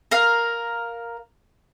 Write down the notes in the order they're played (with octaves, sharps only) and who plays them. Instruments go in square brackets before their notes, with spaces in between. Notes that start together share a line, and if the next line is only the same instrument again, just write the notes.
[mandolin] A#4 F5